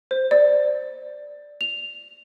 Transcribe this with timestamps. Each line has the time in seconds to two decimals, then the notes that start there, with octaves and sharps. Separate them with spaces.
0.11 C5
0.31 D5
1.61 F7